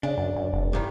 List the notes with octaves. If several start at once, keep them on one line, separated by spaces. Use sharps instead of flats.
C#3 D4
F#2
F#2
F1
G2 D#3 E3